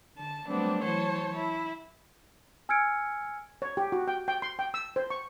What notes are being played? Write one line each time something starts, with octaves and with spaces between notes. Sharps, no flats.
D3 A5
F#3 G3 A3 B3 C4 D4
E3 F#3 C5 C#5 A5
E4
G#5 E6 F6 G#6 C#7 D7
C#5
G4
F#4
G5
G5
C6
G5
E6
C5
C#6